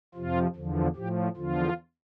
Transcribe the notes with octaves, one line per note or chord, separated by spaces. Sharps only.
F2 C3 F3 F4
E2 D3 F3
A2 F3 G4
E2 D3 F3 F4